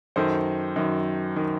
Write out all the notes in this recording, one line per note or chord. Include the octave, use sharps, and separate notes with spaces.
F#2 D#3 A4 C5
F#2 D#3
D#3